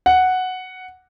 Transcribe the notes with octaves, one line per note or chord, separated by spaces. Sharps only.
F#5